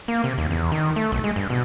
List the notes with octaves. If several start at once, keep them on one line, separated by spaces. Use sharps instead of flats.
A#3
C3
D#2
E2
D#3
A3
B1
G#3
G2
B2